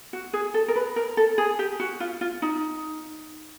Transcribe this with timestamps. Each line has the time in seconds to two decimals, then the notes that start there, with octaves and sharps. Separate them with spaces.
0.13 F#4
0.33 G#4
0.54 A4
0.68 A#4
0.76 B4
0.96 A#4
1.17 A4
1.38 G#4
1.59 G4
1.80 F#4
2.00 F4
2.21 F4
2.42 D#4